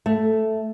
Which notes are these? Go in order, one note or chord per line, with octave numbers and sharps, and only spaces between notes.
A3